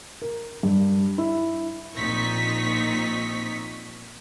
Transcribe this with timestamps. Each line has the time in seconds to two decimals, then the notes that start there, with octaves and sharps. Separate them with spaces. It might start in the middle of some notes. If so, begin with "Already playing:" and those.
0.22 A#4
0.63 G2
1.18 E4
1.96 A#1 A#2 C4 D#4 C#6 B6